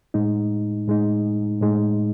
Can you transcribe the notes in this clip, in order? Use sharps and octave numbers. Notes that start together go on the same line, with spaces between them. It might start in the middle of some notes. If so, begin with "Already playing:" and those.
A2 G#3 D#4
A2 G#3 D#4
A2 G#3 D#4